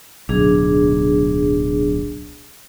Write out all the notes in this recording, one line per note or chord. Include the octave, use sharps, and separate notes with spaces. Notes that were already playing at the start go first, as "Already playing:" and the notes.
D1 B1 D4 G#4